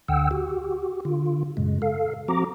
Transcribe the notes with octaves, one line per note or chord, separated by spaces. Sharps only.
D2 D3 F#5 G5 E6
F#4 G4
D3 F4
F#2 A#2 C#3 G#3
A4 F5
F3 C4 F#4 A#5 D6